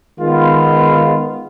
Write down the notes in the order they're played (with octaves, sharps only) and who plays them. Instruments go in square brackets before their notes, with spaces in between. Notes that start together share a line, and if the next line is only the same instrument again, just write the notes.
[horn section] D#3 G#3 B3 F4